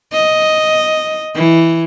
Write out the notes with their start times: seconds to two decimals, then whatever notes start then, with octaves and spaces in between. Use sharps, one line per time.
0.13 D#5
1.35 E3